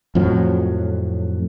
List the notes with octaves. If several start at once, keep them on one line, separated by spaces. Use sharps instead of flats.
F2 A2 F3 F#3